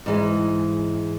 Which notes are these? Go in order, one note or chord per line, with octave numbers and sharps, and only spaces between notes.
G#2 E3 G#3